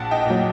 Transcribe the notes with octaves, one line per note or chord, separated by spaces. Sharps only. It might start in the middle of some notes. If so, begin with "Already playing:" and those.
Already playing: A#1 F#5 A5
D#5 G5
A#2 F#3